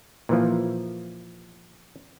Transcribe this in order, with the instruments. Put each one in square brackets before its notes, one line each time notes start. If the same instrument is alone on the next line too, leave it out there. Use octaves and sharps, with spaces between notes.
[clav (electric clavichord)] A#2 E3 F3